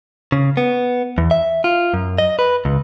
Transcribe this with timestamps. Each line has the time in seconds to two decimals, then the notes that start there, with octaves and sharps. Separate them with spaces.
0.32 C#3
0.57 B3
1.18 E2
1.31 E5
1.64 F4
1.94 F#2
2.18 D#5
2.39 B4
2.65 C#2